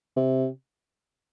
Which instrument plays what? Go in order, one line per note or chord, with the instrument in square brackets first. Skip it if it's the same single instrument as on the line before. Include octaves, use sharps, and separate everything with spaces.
[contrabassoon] C3